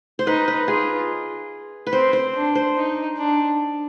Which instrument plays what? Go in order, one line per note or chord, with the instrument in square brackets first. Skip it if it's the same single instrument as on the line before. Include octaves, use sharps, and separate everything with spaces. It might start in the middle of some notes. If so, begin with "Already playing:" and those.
[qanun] C5
[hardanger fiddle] D#4 [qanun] B4
[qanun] B4
[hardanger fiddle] F4 [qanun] G#4
[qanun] B4
[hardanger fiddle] C4 [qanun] C5
[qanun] C5
[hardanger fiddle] D4
[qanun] C5
[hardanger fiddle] D#4
D4